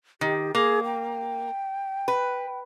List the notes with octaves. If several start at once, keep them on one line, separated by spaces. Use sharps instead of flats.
D#3 G4
A#3 G#4
G5
B4